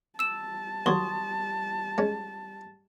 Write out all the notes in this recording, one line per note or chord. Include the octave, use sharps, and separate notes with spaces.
G3 A5 E6 E7
D#2 F#3 C6 C#6 D#6
G#3 C#4